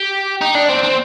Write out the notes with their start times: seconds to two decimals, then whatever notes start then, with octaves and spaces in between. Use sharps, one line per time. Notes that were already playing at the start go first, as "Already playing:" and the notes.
Already playing: G4
0.41 D#4
0.54 D4
0.69 C4
0.83 C4